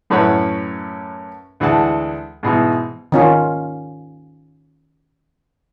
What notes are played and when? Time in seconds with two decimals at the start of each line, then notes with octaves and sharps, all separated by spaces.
0.10 F#2 A2 C#4 B4 C#5 F#5
1.60 D2 E3 G#3 F#5 A5
2.43 G#2 B2 E3
3.12 D#3 C#4 F4